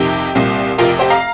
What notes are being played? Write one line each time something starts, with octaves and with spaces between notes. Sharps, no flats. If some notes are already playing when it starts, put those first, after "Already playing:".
Already playing: F2 C3 D#3 G4
C2 A#2 G3 C4
F1 F2 C3 F4 A#4
G4 C5
F5 A#5